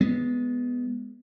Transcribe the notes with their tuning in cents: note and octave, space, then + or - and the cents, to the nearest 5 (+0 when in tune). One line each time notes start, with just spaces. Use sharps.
G#3 +0 B3 +0